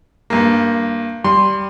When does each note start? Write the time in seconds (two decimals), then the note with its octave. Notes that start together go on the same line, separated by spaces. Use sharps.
0.30 G2 A#3
1.24 G3 C6